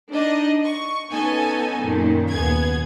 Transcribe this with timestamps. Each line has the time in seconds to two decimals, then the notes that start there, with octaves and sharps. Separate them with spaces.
0.11 D4 D#4 D#5
0.65 C#6
1.11 B3 C#4 D#4 A4 G#5
1.81 F#2 A#2 D#3
2.29 D#2 B3 G#4 G#6